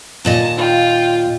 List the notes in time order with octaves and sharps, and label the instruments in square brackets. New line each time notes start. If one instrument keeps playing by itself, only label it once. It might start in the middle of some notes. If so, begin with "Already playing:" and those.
[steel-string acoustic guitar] D#2 A#2 D#5 [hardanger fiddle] A5
[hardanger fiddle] F4 G5